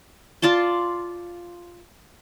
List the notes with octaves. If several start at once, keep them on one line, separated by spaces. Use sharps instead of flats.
F4 D5 A5 C6